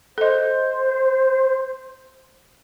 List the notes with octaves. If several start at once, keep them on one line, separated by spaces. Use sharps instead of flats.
A4 C5 D#5